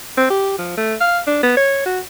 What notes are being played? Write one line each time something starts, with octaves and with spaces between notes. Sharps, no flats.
C4
G4
F3
A3
F5
D4
B3
C#5
F#4